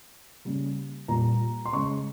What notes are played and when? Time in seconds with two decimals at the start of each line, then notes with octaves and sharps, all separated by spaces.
0.45 C#3 G3 A#3
1.08 A#2 G3 A#3 A#5
1.66 C6
1.73 C#3 G#3 C#6